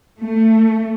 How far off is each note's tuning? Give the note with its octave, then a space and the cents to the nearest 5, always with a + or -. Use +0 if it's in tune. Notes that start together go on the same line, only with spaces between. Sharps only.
A3 +20